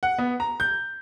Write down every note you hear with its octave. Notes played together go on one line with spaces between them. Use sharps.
F#5
B3
A#5
G6